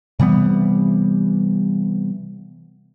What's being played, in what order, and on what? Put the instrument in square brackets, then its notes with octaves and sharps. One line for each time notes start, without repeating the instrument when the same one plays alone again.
[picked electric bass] C3 E3 G3 B3